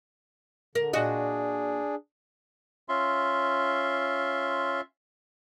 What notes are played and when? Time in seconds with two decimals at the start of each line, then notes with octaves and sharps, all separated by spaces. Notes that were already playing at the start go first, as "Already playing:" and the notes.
0.75 D3 A#4
0.93 A#2 D4 F#4 G#4 D#5
2.89 C#4 F4 E5 C6